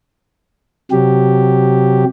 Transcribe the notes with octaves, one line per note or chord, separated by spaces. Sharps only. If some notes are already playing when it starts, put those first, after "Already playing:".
C3 F#3 G4